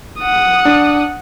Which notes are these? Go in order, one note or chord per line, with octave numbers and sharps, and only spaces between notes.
F#5 D#6
D4